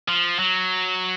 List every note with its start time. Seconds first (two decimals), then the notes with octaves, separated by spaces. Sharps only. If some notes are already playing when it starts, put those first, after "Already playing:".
0.08 F3
0.39 F#3